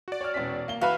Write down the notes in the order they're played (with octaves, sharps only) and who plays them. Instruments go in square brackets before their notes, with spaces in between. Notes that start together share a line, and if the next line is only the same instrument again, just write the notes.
[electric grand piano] F#4 D5
[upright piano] C#5 F6
E1 C#4 B6
A#3 G7
[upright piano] E3 B5 [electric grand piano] F#4 B4 E5 [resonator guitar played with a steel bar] F5